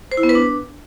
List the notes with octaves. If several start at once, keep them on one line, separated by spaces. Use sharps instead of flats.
C5
E4
B3
B4
D4